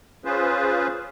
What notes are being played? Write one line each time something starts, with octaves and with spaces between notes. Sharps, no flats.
C#4 F4 G#4 B4 C5